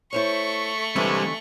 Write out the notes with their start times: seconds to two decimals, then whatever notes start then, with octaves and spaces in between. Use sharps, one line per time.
0.13 A3 E4 C5 C#5 C#6
0.96 D3 E3 G3 G#3 C4